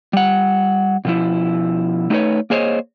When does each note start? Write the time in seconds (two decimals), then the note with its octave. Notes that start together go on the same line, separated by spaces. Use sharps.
0.13 G3 F#5
1.05 B2 F3 E4
2.10 A3 D#4 F#4 G#4 B4 C#5
2.50 A#3 G#4 C5 C#5 D#5